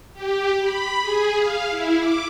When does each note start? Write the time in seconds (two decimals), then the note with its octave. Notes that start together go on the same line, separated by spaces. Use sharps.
0.14 G4
0.59 B5
1.01 G#4
1.37 F5
1.69 E4
1.99 D6